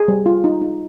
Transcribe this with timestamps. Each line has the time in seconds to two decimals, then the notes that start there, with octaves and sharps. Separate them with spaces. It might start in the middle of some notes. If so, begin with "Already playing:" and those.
Already playing: G#4
0.08 G3
0.26 F4
0.44 D#4
0.61 D#4